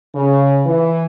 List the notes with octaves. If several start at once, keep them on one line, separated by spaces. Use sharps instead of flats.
C#3
E3